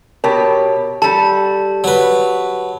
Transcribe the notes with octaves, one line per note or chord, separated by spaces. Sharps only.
B2 G4 A#4 C#5 A5
G3 G4 A4 A5
F#3 B4